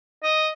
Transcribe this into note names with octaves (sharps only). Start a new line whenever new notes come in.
D#5